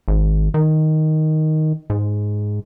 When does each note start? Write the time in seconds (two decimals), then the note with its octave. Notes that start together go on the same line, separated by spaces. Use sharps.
0.08 G#1
0.54 D#3
1.90 G#2